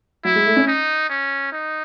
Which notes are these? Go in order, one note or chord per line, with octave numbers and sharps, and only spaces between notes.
F#3 E4
G#3
A3
C#4
D#4
C#4
D#4